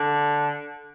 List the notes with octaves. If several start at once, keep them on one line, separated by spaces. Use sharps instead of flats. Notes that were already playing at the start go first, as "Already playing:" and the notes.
Already playing: D3